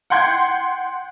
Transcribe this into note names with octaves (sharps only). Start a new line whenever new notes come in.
F#5 G5 C6 G6 G#6